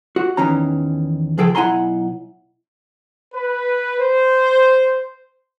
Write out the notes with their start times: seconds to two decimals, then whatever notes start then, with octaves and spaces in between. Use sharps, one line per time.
0.16 F#4
0.37 E2 D#3 E3 C#4 A#5
1.38 C#2 F3 G#4 A4 G5
1.55 B1 E4 F#5 G#5 A#5 C6
3.34 B4
4.00 C5